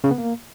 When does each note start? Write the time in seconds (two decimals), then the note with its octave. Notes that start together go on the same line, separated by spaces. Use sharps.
0.04 C#3
0.11 B3
0.18 A#3